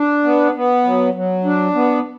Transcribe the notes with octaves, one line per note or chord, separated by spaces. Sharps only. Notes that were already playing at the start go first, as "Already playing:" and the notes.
Already playing: D4
B3
B3
F#3
F#3
D4
B3